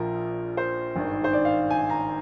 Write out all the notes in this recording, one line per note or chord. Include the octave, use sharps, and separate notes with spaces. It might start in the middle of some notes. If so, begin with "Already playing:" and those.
Already playing: A#1 A#2 F3 A#4
C5
G#1 G2 D#3
C5
D5
F5
G#5
A#5